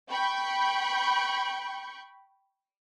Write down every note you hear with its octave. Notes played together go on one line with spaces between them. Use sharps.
G5 B5 C#6 G6